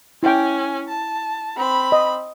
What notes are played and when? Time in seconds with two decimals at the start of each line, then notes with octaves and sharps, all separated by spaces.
0.23 C#4 E4 G5 G#5
0.89 A5
1.56 C4 B5
1.92 D#5